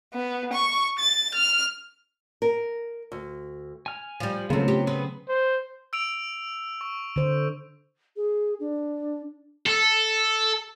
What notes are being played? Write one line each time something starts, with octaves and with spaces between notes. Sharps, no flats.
B3
C#6
A6
F6
A#4
D2
G#5 F6
F3 G3
D#2 C#3 F#3 A3 B3 C4 F4
G4
B3 C4 G#4 B4
C5
E6 D7 F7
C#6
D3 C5
G#4
D4
A4